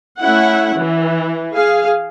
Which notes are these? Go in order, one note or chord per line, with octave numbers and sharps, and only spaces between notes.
A3 C#4 E4 F#5
E3
G#4 F5